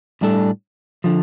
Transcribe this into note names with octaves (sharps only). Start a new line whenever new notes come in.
A2 G3 D4 A4
D3 F3